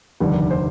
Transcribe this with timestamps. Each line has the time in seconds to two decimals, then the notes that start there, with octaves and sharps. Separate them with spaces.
0.20 F1 D#2 D3 G3
0.51 C5